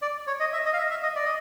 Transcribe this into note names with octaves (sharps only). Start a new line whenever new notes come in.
D5
C#5
D#5
E5
D#5
F5
E5
E5
D#5
D5
D#5